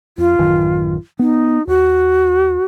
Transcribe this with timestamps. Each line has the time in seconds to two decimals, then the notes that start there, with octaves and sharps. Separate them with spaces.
0.18 F2 F4
0.39 A1 F#2 D#3
1.19 B3 D#4
1.67 D#2 F#4